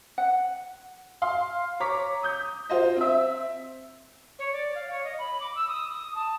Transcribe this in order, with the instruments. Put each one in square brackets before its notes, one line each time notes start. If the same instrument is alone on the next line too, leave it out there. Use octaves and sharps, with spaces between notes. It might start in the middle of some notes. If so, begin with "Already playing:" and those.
[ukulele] F#5
[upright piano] F5 C6
C#5 A#5 D6 B6
D#6 G6
F4 C5 D#5
C4 E5
[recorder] C#5
D5
F5
C#5
D#5
B5
D6
E6
D#6
D#6
A5